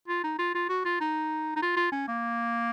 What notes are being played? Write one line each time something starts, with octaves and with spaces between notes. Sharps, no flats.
F4
D#4
F4
F4
F#4
F4
D#4
D#4
F4
F4
C#4
A#3